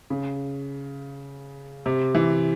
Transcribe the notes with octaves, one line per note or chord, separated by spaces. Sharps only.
C#3
C3
E3